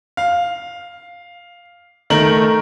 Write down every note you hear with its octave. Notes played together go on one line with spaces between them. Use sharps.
F5
D#3 A3 A#4 F#7